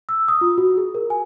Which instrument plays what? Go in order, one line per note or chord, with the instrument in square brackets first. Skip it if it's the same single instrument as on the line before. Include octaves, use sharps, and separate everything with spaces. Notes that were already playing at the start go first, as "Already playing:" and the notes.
[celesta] E6
D#6
F4
F#4
G#4
A#4
G#5